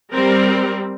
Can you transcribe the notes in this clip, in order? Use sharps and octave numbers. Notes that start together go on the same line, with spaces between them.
G3 C4 A#4